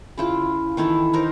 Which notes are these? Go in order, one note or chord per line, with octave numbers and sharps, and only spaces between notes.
C#3 E4 F4
D#3 E3 E4 A4
D#4 A#4 C5